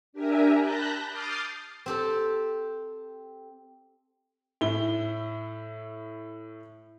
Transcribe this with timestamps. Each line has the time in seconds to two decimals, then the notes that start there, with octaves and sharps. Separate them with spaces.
0.13 D4 G4 A#4 E5 G#5 A#5
0.59 A5 B5 F#6 G6 A#6
1.07 D6 D#6 F6 G6 A6 C7
1.86 C4 G4 A4
4.61 A2 E4 G7